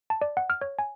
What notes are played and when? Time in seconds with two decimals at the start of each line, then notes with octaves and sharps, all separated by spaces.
0.10 A5
0.22 D5
0.37 F#5
0.50 F6
0.61 C#5
0.79 G#5